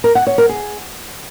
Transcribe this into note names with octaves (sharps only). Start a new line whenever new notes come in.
A#4
F#5
C#5
A#4
G#4